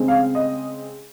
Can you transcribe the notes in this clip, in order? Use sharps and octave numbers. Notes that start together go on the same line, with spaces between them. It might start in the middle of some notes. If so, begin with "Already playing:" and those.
Already playing: C#3 G#3 C4
F5
D#5